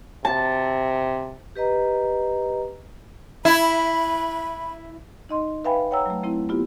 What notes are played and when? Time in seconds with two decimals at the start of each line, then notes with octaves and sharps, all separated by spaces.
0.25 C3 A5
1.56 G4 B4 D#5 A#5
3.45 E4 B5
5.29 D#4 D#5 C6
5.65 B4 E5 F5 G5 G#5 B5
5.91 C#5 F#5 G5 A#5 E6
6.06 F#3 A3
6.23 A3 C4 E4
6.49 B3 E4 F4 G4